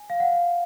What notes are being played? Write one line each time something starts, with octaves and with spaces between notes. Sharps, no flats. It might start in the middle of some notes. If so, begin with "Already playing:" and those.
Already playing: G#5
F5
F#5